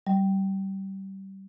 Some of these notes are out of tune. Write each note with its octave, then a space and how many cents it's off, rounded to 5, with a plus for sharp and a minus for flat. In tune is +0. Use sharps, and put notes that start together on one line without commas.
G3 -25